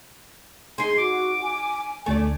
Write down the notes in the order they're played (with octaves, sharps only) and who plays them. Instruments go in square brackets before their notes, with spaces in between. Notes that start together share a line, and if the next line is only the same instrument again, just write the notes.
[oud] D#4 G#4 [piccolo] C6
[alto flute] F#4 [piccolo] D6
[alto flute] G#5
[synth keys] D2 G#5 [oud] A3 D5